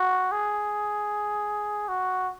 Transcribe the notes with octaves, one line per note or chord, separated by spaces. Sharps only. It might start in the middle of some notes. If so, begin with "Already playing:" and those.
Already playing: F#4
G#4
F#4